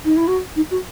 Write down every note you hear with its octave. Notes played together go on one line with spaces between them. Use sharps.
D#4
E4
F#4
D#4
F#4